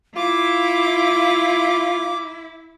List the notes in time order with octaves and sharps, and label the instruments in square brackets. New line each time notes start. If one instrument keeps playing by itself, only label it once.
[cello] E4 [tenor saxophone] F4 [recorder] D6